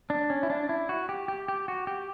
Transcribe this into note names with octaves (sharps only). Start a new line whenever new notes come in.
D4
C#4
E4
D4
E4
F#4
G4
G4
G4
F#4
G4